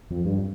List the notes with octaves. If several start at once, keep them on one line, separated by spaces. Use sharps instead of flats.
F2
G2